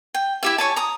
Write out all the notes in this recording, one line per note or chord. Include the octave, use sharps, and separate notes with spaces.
G5
E4 G4 E5
C#5 G#5 A5
A#5 D#6